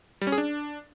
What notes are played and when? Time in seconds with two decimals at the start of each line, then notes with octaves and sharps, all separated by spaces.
0.21 G3
0.27 C#4
0.32 G#4
0.38 D4